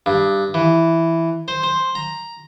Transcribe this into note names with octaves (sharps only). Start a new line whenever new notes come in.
G2
E3
C5
C5
A#5